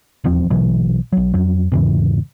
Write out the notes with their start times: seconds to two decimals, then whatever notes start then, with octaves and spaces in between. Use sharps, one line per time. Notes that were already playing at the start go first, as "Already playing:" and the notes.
0.24 D#1 E2 F3 C4
0.50 A#1 B2 E3 F#3
1.13 B1 F#3
1.34 F2 F#3
1.72 E2 G#2 C#3 E3